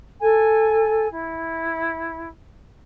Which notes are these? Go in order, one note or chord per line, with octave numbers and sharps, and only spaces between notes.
A4 G#5
E4